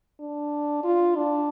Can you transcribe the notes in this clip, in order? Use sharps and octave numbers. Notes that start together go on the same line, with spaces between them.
D4
F4
D4